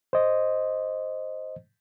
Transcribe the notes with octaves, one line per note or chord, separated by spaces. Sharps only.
C5 D#5